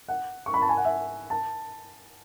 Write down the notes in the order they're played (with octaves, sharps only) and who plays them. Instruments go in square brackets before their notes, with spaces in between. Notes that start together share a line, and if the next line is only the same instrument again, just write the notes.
[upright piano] F#5
C#6
B5
A5
G#5
F#5
E5
A5